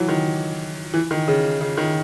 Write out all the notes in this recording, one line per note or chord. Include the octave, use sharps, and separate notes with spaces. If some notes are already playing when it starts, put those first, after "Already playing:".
Already playing: E3 F#3
D#3
E3
D#3
C#3
C#3
D#3